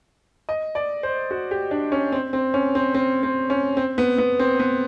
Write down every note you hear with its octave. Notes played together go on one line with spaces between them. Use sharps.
D#5
D5
C5
F#4
G4
D4
C#4
C4
C4
C#4
C4
C4
C4
C#4
C4
B3
B3
C4
B3